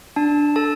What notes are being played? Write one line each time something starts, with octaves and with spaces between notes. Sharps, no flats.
D4 A5
A4 A5